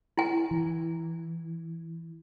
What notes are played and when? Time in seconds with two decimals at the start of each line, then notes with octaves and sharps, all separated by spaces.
0.18 E4 G#5
0.51 E3